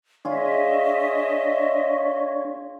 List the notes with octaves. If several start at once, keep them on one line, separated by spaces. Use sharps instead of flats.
D4 F4 G#4 C#5 D#5 E5